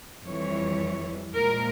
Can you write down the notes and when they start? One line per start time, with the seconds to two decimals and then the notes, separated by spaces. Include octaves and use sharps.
0.24 F2 E3 G3 C#5
1.34 A#2 F3 G#3 A#4